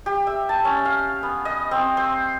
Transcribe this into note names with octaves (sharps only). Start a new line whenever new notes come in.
G4
E5
A5
C#4
F5
B3
D#5
C4
C5